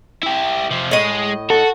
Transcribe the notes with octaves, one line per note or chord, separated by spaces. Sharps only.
E4 G4
C3 F3
A2 G#3 D#5
F#4 A4